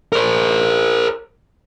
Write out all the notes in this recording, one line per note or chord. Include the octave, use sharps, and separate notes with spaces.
A#4 C5